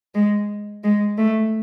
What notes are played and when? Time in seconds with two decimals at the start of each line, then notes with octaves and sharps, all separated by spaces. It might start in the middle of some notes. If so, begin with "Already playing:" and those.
0.15 G#3
0.84 G#3
1.18 A3